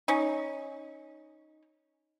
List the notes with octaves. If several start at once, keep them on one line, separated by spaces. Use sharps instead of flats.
C#4 D#4